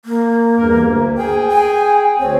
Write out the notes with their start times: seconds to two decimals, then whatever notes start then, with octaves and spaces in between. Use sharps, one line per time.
0.05 A#3
0.57 E2 G2 A#4
0.82 D2
1.18 G#4 G5 G#5
1.49 G#5
2.20 D2 C4 C#5